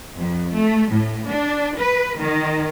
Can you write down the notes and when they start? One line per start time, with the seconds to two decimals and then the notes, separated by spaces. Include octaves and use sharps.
0.18 F2
0.54 A3
0.93 A2
1.29 D4
1.78 B4
2.20 D#3